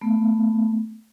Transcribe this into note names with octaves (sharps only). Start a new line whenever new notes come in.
A3 B3